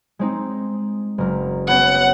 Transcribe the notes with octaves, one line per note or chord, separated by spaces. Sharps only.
G#3 C4 D#4
F#1 A#4
B3 C#4 F#5